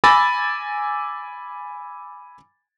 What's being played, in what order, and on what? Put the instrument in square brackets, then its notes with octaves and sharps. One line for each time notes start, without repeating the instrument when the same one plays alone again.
[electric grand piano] G#5 B5 D6 E6 A6 A#6